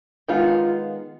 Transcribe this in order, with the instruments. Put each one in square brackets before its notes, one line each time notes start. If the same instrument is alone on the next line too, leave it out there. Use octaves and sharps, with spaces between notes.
[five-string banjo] D#3 G#3 B3 F4